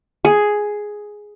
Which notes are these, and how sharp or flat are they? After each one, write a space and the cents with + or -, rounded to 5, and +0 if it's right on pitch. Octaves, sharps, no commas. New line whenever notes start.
G#4 +5